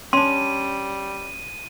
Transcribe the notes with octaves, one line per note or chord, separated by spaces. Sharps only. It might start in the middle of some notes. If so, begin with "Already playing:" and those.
G3 C#4 D4 C6 D#7